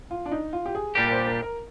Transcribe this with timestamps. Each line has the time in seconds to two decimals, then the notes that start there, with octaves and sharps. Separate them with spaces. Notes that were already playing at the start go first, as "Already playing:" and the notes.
0.11 F4
0.26 D4
0.31 D#4
0.53 F4
0.66 G4
0.75 G#4
0.95 A#2 G3 D4 G4 A#4
1.06 A#4
1.11 C5
1.27 A#4
1.42 A#4